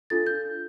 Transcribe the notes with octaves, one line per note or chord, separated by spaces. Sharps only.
D4 F4 A4 A6
G6